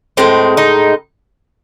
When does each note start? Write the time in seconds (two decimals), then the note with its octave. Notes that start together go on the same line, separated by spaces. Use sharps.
0.17 A2 G#3 C4
0.57 D#4